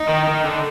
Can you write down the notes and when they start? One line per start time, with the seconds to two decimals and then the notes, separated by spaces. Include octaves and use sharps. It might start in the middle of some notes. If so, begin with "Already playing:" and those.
Already playing: D#4
0.09 D#3
0.28 D#3
0.46 D3